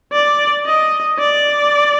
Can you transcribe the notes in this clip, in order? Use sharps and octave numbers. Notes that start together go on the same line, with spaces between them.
D5
D#5
D5